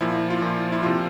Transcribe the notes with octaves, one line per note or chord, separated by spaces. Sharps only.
A#2 F3 E4
F4
A#2 F3 E4
E4
C3 F3 F4